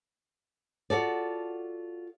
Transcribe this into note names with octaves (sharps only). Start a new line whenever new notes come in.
F4 F#4 A4 D5